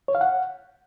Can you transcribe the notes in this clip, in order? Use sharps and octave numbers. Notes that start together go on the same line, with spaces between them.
C#5
F5
F#5